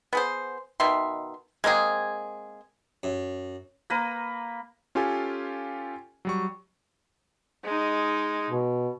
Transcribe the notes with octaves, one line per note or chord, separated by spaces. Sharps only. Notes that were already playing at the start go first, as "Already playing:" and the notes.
B3 G#4 C5
B2 D#3 E5 C6
G#3 A#3 C4 G#4
F#2
A#3 B4 A#5
C#4 F4 G4 A4 G#5
F#3 G3 C#6
G#3 D#4
B2